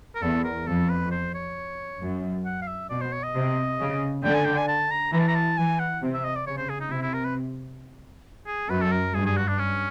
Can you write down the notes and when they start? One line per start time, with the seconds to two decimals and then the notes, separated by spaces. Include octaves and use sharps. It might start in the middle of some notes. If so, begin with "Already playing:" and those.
0.15 A#4
0.22 E2 A4
0.44 A#4
0.67 F2 A4
0.89 B4
1.11 C5
1.34 C#5
2.01 F#2
2.45 F#5
2.62 F5
2.68 E5
2.89 B2 D5
3.01 C5
3.12 C#5
3.23 D#5
3.35 C3
3.79 C#3
4.24 D3 G5
4.34 G#5
4.46 G5
4.58 G#5
4.68 A5
4.91 A#5
5.12 E3 A#5
5.20 A5
5.28 A#5
5.35 A5
5.58 E3 G#5
5.80 F#5
6.02 C3
6.14 E5
6.24 D#5
6.35 D5
6.46 C#3 C#5
6.57 C5
6.69 G#4
6.80 D#4
6.91 C3 E4
7.02 E4
7.14 A#4
7.25 B4
8.47 G#4
8.70 F#2 B4
8.81 A4
8.92 A#4
9.14 G2 G#4
9.26 G#4
9.37 F#4
9.48 D4
9.59 C#4